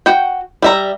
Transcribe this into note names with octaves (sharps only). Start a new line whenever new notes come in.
F#4 G5
G3 E5 A#5